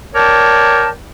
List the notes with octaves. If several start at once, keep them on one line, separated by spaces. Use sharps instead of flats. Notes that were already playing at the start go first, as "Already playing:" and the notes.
A#4 C#5 D5 G5 A5